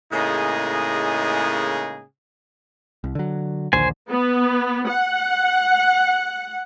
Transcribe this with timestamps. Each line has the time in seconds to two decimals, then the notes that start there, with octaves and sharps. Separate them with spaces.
0.12 A2 C#3 G#3 A#3 D#4 G#4
3.04 C2
3.15 D3 F#3
3.73 A#1 D#2 D3 C5 G#5
4.10 B3
4.88 F#5